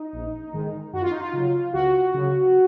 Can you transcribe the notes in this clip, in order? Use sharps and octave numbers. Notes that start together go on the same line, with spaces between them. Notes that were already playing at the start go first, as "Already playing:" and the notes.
Already playing: D#4
A#1
G#2 D#3 G#3
F#2 F#4
F4
D#4
F4
C#3 F#3
C#2 F#4
C#3 F#3